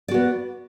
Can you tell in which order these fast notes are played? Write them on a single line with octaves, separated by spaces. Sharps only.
D5 F#4 B3